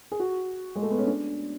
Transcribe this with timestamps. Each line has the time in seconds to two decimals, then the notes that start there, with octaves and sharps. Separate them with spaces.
0.12 G#4
0.20 F#4
0.76 G#3
0.82 A3
0.91 B3
0.98 C#4
1.07 D4